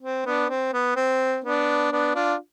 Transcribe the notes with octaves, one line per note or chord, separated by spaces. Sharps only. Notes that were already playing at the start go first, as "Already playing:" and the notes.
C4
B3 D4
C4
B3
C4
B3 D4
B3 D4
D4 F4